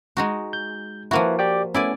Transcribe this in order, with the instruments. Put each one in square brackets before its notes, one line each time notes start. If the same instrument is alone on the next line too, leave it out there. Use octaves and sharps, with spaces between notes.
[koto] G#3 D#4 F#4
[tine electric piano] G6
[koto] F3 A#3 F#4 [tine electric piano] E4 B4
[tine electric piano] G4 D5 G5
[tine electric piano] A3 B3 C#4 [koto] E4 D5 G#5